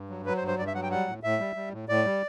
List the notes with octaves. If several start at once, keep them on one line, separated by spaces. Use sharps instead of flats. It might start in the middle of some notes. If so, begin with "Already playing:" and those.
Already playing: G2
F#3
F#3 B4
C5
G2
C5
G2 D5
E5
F#3 F#5
G5
G3 F#5
A2
A2 E5
G3
G3
A2
A2 D5
G3